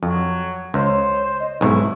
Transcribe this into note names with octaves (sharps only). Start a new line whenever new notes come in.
F2 F#3
C#2 C5 C#5
D#5
B1 G#2 C3 E4 C#6